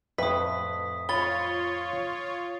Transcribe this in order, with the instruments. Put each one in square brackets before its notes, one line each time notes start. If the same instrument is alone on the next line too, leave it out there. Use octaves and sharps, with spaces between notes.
[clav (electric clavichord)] F2 A2 [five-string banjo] B4 E5 [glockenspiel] D#6 B6
[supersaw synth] F4 C#5 [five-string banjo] B5 [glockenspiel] A6 G7